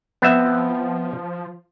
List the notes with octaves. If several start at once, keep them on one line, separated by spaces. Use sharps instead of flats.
F3 B3 C4 E5